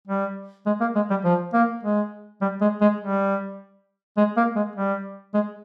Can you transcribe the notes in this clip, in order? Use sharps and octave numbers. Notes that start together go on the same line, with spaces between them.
G3
G#3
A#3
G#3
G3
F3
A#3
G#3
G3
G#3
G#3
G3
G#3
A#3
G#3
G3
G#3